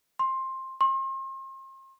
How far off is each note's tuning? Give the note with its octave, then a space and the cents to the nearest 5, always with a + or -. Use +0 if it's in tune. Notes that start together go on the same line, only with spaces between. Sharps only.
C6 +15
C6 +40